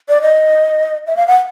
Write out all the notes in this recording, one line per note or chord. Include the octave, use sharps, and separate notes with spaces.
D5
D#5
E5
F5
F#5